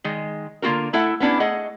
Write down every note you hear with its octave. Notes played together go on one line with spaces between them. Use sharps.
D#3 G#3
D3 A#3 F4 F#4 A#4
A3 E4 A4 E5 F#5
B3 C#4 D4 E4 G4
A3 G#4 D#5 F#5